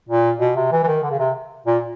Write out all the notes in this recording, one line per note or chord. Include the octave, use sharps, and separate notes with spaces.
A#2
B2
C3
E3
E3
D#3
D3
C#3
C3
A#2